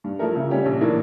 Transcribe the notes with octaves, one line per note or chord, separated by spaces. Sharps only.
G2
F3 A3 E4 A#4
C#3
G3 C#4 G4
A#1
A2 E3 A#3 D4